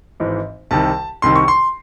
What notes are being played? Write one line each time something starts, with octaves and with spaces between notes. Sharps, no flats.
G#1 G#2 E3
C2 C3 D#3 A5
C2 C3 D#3 C6
C#6
C6